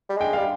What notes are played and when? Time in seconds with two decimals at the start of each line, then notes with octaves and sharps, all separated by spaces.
0.09 G3
0.17 G#3 G5
0.33 F5
0.38 G3